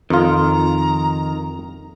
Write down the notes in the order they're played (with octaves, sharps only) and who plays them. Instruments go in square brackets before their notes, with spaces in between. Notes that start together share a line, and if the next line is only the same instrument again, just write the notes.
[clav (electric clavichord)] F2 F4 [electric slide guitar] D#3 [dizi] A#5